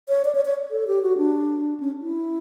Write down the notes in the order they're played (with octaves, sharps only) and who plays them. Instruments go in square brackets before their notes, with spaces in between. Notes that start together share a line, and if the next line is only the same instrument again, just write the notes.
[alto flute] C#5
D5
C#5
C#5
A4
G4
F#4
D4
C#4
E4